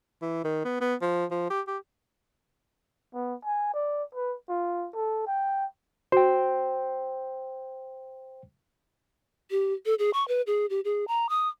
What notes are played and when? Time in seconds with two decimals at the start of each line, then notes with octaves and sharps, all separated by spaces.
0.22 E3
0.44 D#3
0.65 B3
0.81 B3
1.02 F3
1.31 F3
1.50 G4
1.67 G4
3.14 B3
3.45 G#5
3.74 D5
4.15 B4
4.49 F4
4.94 A4
5.27 G5
6.12 F#4 C5 G5
9.51 G4
9.86 A4
9.99 G#4
10.13 C#6
10.28 B4
10.47 G#4
10.70 G4
10.85 G#4
11.08 A#5
11.29 D#6